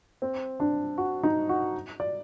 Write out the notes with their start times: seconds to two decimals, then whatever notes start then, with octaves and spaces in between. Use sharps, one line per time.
0.22 C4
0.60 D4
0.98 F#4
1.23 D#4
1.49 F#4
2.00 D5